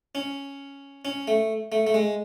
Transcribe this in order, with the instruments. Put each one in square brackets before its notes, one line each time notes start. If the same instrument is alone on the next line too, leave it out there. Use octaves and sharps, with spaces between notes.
[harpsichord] C#4
C#4
A3
A3
A3
G#3